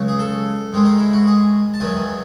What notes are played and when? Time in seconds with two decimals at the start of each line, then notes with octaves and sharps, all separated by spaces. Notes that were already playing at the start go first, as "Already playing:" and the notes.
Already playing: C#2 C#3 F#3 C#4
0.08 G#4
0.19 A4
0.73 G#2 D#3 G#3
0.85 D#4
0.99 E4
1.13 F#4
1.27 G#4
1.74 A5
1.80 E2 D#3 F#3 G#5